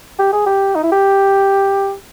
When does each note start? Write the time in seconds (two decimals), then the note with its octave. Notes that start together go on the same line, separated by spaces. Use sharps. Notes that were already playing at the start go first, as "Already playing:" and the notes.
0.19 G4
0.33 G#4
0.46 G4
0.75 D#4
0.83 E4
0.92 G4